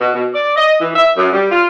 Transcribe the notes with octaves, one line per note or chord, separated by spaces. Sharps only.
B2
B2
D5
D#5
E3
E5
F#2
G3
F4